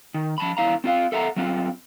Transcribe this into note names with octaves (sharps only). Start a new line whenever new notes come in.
D#3
F3 A5 B5
E2 E4 F5 A#5
C4 F4 F5
A4 E5 F#5 G#5 A#5
F#3 C4 F4